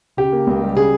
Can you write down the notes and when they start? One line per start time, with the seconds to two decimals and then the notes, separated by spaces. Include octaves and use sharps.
0.17 C#3 G4
0.33 A#3
0.47 C#2
0.62 G3
0.76 C#3 G#4